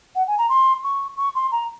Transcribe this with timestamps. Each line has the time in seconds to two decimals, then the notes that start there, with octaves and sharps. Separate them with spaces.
0.15 F#5
0.27 G#5
0.38 A#5
0.49 C6
0.84 C#6
1.17 C#6
1.35 C6
1.52 A#5